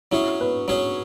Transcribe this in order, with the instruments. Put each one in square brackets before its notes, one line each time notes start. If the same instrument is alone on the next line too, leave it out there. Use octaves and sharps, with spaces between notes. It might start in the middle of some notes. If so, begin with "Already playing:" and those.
[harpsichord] F#3 C#4 G#4 [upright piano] E4
[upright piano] B4
[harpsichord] F#3 C#4 G#4 [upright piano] C#5